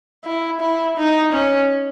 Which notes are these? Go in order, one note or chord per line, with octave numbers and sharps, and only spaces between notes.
E4
E4
D#4
C#4